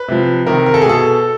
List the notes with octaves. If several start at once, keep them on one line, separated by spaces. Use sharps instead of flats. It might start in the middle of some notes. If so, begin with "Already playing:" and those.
Already playing: B4
C3 F3
C3 D#3 A#4
A#4
A4
G#4
B2 A4